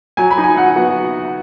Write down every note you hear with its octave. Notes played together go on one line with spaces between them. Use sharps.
F#3 G#5
B5
D#4
G#5
F#3 F#5
B3 F#4